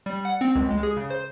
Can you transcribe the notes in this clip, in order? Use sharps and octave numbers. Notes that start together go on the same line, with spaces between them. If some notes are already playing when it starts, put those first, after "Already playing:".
G3
F#5
C4
C#2
G#3
G#4
C#3
C5